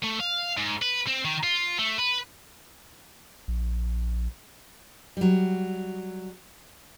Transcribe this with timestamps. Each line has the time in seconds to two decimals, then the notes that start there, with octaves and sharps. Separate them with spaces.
0.02 A3
0.20 F5
0.57 G#2
0.82 B4
1.07 C4
1.25 D#3
1.43 F4
1.79 A3
1.98 B4
3.48 A#1
5.17 F#3 G3